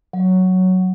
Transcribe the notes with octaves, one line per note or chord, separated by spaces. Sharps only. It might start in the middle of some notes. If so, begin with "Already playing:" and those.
F#3